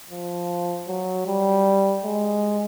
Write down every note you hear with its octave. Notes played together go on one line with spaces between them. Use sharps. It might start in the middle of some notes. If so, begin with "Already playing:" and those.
F3
F#3
G3
G#3